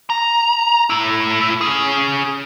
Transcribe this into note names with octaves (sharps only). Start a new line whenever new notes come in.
A#5
A2 E4
C#4 G#4